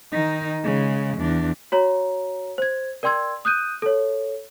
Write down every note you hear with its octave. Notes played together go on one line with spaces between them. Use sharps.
D#3 D#4
C#3 G#3
E2 D4
F#4 C#5 A#5
C5 G#6
A#4 D5 G5 C6 E6 G#6
D#6 F#6 G6 D#7
A4 C#5